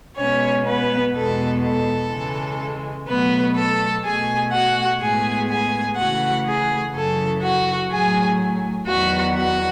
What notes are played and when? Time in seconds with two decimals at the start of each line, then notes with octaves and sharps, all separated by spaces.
0.16 B2 G#3 B3 C#4 C#5
0.66 B3 B4
1.13 E2 B2 G#3 B3 A4
1.61 A4
2.10 C#3 E3 G#3
3.07 B2 F#3 A3 B3 B4
3.55 A4 A5
4.04 B2 A3 G#4 G#5
4.51 F#4 F#5
5.00 A2 G#3 B3 G#4 G#5
5.48 G#4 G#5
5.97 C#3 E3 A3 F#4 F#5
6.46 G#4
6.94 F#2 C#3 E3 A4
7.41 F#4 F#5
7.90 A2 F#3 A3 G#4 G#5
8.86 E2 D#3 F#3 B3 F#4 F#5
9.35 F#4 F#5